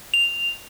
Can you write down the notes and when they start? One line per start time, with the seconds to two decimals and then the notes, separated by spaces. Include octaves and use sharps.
0.14 F7